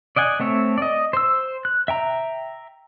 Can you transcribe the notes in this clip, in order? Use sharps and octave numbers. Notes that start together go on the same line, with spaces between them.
D5 D#5 F#5 G#5
A3 C4 C#5 E5
D5 D#5
C5 E6
F#6
E5 G5 A#5